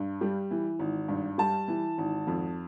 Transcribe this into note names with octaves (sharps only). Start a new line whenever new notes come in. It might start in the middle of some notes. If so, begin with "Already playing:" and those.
Already playing: G2
G3
E3
G#1
G2
G3 A5
E3
G#1
F2